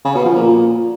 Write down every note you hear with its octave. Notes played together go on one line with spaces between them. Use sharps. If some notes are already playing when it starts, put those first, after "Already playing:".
C#3
B2
F3
A#2